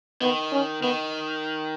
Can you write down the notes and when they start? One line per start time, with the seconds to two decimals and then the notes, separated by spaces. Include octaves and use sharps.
0.21 D#3 B3
0.52 C#4
0.82 D#3 B3